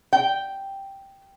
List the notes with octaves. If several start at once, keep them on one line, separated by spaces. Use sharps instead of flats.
G5